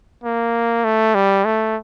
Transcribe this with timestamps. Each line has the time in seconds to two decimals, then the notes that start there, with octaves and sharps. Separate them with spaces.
0.24 A#3
0.84 A3
1.15 G3
1.45 A3